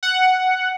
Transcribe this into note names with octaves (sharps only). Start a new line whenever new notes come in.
F#5